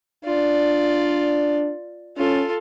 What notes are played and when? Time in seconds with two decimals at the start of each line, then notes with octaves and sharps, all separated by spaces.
0.25 D4 F4 D5
2.17 C#4 F4 A4